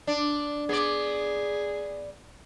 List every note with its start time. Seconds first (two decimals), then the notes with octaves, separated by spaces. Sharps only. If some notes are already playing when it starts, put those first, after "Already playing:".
0.07 D4 D5
0.69 B3 G#4 D5